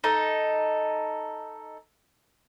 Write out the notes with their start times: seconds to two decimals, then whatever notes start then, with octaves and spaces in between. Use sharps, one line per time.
0.04 D#4 A4